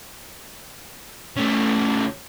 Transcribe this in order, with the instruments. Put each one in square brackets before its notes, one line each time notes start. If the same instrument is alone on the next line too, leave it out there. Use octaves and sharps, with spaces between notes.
[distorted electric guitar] C#3 A3